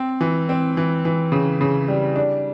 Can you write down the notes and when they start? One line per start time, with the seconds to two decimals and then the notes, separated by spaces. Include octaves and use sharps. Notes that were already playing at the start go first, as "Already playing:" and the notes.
Already playing: C4
0.21 E3
0.49 C4
0.77 E3
1.05 E3
1.32 C#3
1.61 C#3
1.88 G3
2.16 D4